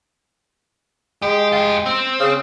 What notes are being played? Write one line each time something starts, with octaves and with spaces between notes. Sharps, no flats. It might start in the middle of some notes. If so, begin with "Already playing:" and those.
G#3 G4
F4 G4
C4
C#3